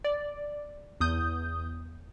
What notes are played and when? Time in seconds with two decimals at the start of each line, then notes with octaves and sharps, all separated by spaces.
0.04 D5
1.01 E2 D#6 G6